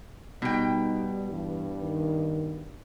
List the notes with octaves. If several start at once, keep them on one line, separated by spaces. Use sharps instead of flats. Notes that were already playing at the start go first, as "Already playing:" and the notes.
B2 G3 D#4 G5
G2 E3
D#3